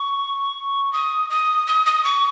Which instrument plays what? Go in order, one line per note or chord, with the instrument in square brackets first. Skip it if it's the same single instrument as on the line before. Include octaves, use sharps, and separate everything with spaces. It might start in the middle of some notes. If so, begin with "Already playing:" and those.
Already playing: [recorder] C#6
D#6
D#6
D#6
D#6
C#6